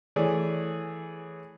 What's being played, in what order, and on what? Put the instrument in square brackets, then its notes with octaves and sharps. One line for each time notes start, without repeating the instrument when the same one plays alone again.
[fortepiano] E3 A3 G#4 C#5 D5